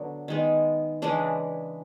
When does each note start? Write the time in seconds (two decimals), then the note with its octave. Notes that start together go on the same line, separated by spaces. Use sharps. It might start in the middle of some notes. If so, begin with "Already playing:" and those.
Already playing: D3 F#3 B3 D4
0.28 D#3 G#3 B3
1.02 C#3 E3 G#3 D4